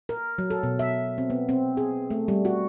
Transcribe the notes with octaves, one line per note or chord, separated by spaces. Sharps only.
A#4
F#3
A4
B2
E5
C4
B3
C4
G#4
A3
G3
F#4